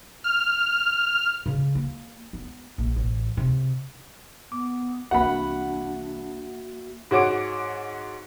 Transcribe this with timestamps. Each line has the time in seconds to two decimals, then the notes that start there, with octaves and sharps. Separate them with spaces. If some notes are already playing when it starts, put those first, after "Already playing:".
0.24 F6
1.46 C#3
1.75 A#3
2.33 B3
2.78 A#1
2.96 A1
3.37 C3
4.52 B3 D6
5.11 C2 E3 A#3 D4 F#4 E5 F#5 B5
7.11 G#2 F#4 C#5 D6 D7